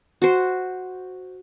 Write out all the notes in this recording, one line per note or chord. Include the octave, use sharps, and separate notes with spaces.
F#4 C5